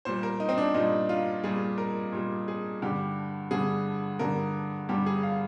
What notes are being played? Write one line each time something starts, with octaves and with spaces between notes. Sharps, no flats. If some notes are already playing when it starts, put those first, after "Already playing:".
A#2 G3 C5
A#4
D#4
C4
D4
A#2 G3 D#4
F4
A#2 G3 G#4
A#4
A#2 G3
G#4
G2 D3 G3 G4
G2 D3 G3 G#4
G2 D3 G3 A#4
G2 D3 G3 G4
G#4
F5